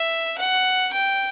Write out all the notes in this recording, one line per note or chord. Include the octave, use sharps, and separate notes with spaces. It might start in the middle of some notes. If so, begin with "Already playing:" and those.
Already playing: E5
F#5
G5